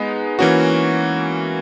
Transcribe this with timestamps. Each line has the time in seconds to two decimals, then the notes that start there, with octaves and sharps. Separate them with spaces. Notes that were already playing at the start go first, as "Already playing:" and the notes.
Already playing: G#3 B3 D#4
0.39 E3 A#3 C#4 F#4